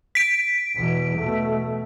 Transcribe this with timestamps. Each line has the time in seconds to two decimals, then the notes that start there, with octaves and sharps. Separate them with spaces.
0.15 B6 D7
0.74 E2 B2
1.17 B2 A3